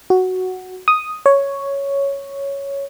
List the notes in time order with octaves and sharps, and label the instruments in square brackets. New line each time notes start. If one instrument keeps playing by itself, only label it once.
[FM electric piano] F#4
D#6
C#5